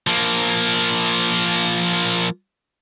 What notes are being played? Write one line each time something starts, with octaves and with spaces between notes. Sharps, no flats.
F3 A#3